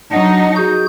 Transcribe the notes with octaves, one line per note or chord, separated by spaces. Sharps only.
F#3 D4 D#4 D#5 F#5
F#4 G#4 G6